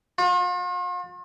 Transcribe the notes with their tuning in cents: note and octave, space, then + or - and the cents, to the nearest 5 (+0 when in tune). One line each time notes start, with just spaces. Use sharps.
F4 +45